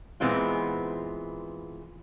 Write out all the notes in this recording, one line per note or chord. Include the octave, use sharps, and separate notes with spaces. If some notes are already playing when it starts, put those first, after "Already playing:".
A#2 E3 G#3 B3 C4 F4